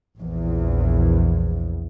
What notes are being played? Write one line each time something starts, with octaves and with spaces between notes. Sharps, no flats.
A#1 E2